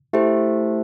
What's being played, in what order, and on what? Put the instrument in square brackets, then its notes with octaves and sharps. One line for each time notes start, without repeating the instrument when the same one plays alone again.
[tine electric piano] A3 [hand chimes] E4 G4 C5